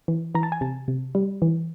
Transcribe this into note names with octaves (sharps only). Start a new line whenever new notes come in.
E3
E3 A#5
A5
G#5
C3 A5
C3
G3
E3